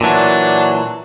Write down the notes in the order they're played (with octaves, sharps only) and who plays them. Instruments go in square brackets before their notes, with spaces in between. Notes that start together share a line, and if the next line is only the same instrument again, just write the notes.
[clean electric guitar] A#2 E3 [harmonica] F#3 D4